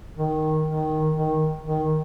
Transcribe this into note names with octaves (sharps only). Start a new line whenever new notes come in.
D#3
D#3
D#3
D#3